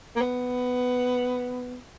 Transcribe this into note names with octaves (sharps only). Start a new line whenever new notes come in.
A#3
B3